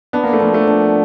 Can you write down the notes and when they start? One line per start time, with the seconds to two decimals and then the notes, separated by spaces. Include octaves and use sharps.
0.13 B3 D4
0.24 A#3
0.33 A3
0.40 F3 A#3
0.54 A3
0.67 D4